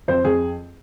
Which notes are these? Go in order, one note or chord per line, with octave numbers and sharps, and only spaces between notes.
F2 C5
F2 G#4